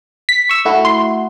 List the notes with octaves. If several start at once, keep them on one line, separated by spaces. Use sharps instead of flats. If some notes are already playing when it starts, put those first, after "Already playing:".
B6
C#6 E6
A3 E4 F#4
C6